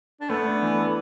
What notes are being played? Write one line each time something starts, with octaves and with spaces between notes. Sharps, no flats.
D4
A3 B3
D4
E3
A4